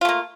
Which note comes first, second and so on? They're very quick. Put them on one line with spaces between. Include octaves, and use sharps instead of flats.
F4 A3 A#3